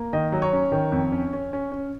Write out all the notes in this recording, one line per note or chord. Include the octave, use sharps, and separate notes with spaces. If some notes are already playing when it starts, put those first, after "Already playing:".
Already playing: A#3
D#3 D#5
F#3
C#5
C#4
D#3
F2
C#4
C#4
C#4
C#4